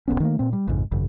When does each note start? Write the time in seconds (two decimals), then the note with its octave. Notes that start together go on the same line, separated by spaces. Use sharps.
0.08 D#1 B1 B3 C#4
0.20 D#3 A3 A#3
0.39 A#2 C4
0.53 G3
0.68 A1 F2 G#2 C#3
0.92 G#1 F#2 C#3